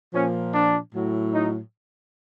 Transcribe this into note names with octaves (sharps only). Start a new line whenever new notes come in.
A#2 F3 C#4
D4
A2 F#3
D#4